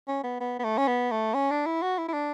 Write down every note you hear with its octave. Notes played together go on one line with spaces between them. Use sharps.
C#4
B3
B3
B3
A3
C#4
B3
A3
C#4
D4
E4
F#4
E4
E4
D4